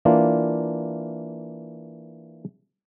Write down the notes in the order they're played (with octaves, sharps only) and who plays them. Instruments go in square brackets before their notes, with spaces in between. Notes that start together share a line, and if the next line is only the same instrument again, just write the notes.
[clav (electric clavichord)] E3 A#3 D4 F4